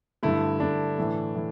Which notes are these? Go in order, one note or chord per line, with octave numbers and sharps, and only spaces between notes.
G2 D3 A3 E4
G2 D3 A3 D4
A2 E3 A3
A2 E3